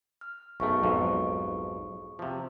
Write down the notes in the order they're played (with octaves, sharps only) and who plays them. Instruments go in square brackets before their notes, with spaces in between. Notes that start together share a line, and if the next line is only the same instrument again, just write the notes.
[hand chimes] F6
[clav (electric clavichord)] B1 F#2 A3 [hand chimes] G#4 C#6
[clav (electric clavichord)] B1 F2 G#2
C3 F3